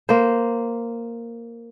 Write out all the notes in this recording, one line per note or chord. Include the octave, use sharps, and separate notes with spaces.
A#3 C5